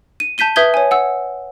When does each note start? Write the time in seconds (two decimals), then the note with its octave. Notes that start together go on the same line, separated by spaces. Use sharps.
0.20 D#7
0.38 A5 G6 B6 D#7 G7
0.56 B4 E5 D#6 G6 G#6 G7
0.74 C#5 G#5
0.91 F#5 E6